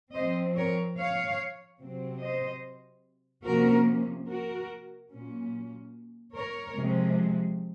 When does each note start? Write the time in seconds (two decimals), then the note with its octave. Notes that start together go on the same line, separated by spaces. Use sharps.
0.15 F3 C4 C5 D#5
0.57 A#4 C#5
0.98 C#5 F5
1.81 C3 F#3 C4
2.22 C5 D#5
3.45 C3 F3 A#3 C#4 F#4 A#4
4.28 F#4 A#4
5.11 A#2 F#3 C#4
6.35 A#4 C#5
6.76 C3 F3 G#3